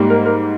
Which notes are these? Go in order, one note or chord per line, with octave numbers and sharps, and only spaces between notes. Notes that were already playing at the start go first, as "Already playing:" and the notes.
Already playing: G#2 G3 A#3
A#4
A#4